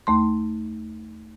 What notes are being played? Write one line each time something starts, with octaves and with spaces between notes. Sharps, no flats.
D#2 A3 C6